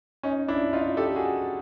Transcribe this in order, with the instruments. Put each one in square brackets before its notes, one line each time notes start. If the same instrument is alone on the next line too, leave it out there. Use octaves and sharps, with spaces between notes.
[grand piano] C#4 D#4
D4 E4
D#4 F4
G4 A4
F#4 G#4